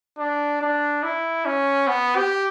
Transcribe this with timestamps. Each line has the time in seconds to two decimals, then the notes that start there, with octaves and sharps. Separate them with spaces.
0.19 D4
0.61 D4
1.03 E4
1.46 C#4
1.87 B3
2.16 G4